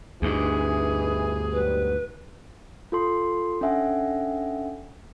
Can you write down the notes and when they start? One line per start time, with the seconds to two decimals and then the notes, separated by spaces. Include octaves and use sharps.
0.22 D2 G2 E3 D#4 E4 G#4
1.53 G#2 F#3 G3 B4
2.92 F4 A4 C6
3.61 C#4 D4 A4 E5 F#5 G#5